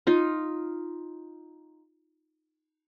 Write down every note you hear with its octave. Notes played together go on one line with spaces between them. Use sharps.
D#4 F4